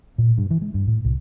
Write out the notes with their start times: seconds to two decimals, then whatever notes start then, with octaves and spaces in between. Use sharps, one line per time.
0.18 A#2
0.38 G2
0.51 E3
0.62 G#3
0.74 G2
0.87 A2
1.05 C2